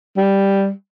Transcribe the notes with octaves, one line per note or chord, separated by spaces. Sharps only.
G3